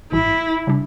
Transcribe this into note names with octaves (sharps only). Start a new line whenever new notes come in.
A1 G2 E3 E4
C#3 G3 D4